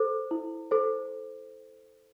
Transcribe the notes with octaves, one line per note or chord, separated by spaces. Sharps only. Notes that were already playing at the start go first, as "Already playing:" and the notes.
Already playing: A4 C5
E4
A4 C5